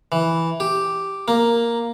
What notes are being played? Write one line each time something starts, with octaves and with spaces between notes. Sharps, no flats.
E3
G4
A#3